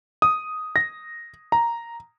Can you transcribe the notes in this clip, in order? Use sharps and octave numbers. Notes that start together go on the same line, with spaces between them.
D#6
A#6
A#5